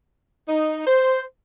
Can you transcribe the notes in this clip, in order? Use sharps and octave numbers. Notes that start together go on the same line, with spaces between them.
D#4
C5